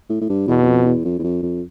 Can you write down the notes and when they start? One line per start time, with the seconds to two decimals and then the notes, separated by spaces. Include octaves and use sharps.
0.10 A2
0.21 A2
0.29 G2
0.48 E2 B2
0.62 E2
0.66 F2
0.86 E2
1.05 F2
1.19 E2
1.23 F2
1.43 F2